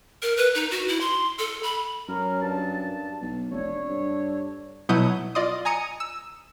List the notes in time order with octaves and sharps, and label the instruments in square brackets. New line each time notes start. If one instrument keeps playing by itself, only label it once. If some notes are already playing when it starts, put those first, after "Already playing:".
[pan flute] A#4
B4
D#4
F#4
E4
C6
A4
B5
[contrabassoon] F#2 [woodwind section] C#4 A#4
[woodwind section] G2 A5
[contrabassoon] B1
[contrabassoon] F1 [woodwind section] D4 A4 C#5
[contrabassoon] G2
[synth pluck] B2 F#3 E4 D#6 G6
F4 D5 D#5 C6 D#6
G#5 A#5 D#6 C#7 D#7
E6